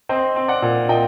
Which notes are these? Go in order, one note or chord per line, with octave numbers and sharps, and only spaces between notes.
C4 C5 D#5
C4
D5 F#5
A#2
A#2 D#5 G5